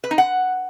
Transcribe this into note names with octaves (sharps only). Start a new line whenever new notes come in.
B4
D#4
F#5